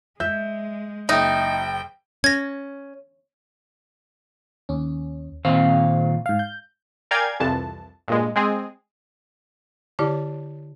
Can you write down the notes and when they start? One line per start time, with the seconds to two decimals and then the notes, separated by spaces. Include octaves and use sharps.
0.20 G#3 E5 G6
1.09 F#1 D#4 E5 G5
2.24 C#4 G#6 A#6
4.69 D#2 C#4
5.45 A#2 D#3 C4 F5
6.26 G#2 F5
6.39 G6
7.11 A#4 D5 F5 G5 G#5 G#6
7.40 C2 F2 E3 A5
8.08 G2 A#2 G#3
8.36 G#3 C4 G#4
9.99 D3 E4 G4 C#5 D5 A5